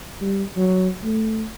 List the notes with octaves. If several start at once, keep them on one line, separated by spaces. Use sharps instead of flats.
G3
F#3
A3